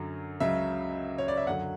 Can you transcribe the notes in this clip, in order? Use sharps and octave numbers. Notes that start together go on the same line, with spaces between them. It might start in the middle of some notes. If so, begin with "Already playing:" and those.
Already playing: F#2 D3 F#3
C#2 C#3 F#3 E5
C#5
D5
E5
F#2 D3 F#3 F#5